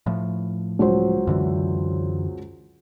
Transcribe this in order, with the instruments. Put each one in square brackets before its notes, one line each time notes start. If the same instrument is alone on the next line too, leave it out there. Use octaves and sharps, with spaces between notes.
[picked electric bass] A2 F3
[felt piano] C#2 F#3 C5
[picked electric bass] F#2 D3 E3